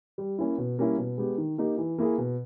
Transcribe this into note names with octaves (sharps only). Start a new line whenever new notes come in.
G3
A#3 C#4 E4
B2
G3 A#3 C#4 E4
B2
G#3 B3 G4
D#3
A#3 D#4 G4
E3
A#3 E4 G#4
B2